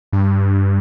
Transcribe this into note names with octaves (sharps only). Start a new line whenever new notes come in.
G2